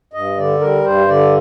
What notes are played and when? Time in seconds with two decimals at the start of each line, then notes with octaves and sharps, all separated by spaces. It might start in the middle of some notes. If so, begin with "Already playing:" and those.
0.13 G2 D#5
0.37 D3 D5
0.61 G3 A#4
0.84 G2 C5
1.08 D3 D5